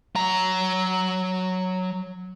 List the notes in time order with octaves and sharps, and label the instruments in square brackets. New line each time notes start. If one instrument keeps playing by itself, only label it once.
[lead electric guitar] F#3 A#5